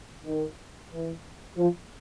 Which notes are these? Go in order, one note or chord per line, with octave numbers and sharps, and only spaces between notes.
D#3
E3
F3